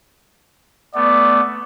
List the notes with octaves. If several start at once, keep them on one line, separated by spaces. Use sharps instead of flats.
A3 B3 D5